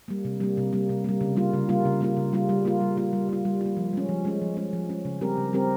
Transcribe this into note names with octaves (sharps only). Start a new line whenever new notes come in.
G3 A#3
C3
G3 A#3
C3
G3 A#3
C3
G3 A#3
C#3
G3 A#3 F4
C#3
G3 A#3 F4
C#3
G3 A#3 F4
C#3
G3 A#3 F4
G3
A#3 F4
G3
A#3 F4
G3
A#3 F4
G3
A#3 F4
F3
G#3 C#4
F3
G#3 C#4
F3
G#3 C#4
F3
G#3 C#4
C#3
G3 C4 G4 A#4
C#3
G3 C4 G4 A#4